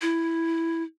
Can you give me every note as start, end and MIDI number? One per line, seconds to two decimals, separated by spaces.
0.01 0.83 64